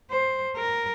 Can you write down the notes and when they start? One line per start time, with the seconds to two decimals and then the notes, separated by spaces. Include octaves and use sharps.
0.10 C5
0.57 A#4